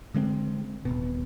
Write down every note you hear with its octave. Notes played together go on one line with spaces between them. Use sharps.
D3 G#3 A3 C4
D#1 G#1 B2